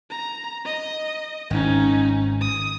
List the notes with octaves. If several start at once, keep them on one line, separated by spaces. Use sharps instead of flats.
A#5
D#5
G#1 C#4 D#4
D#6